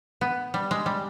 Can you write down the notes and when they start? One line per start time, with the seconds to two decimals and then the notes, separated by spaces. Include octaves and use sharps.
0.21 B3
0.54 G3
0.71 G#3
0.86 G3